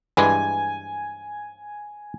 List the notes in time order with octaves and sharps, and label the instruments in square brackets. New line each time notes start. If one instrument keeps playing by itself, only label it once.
[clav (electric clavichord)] G2 E3 G#3 [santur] G#5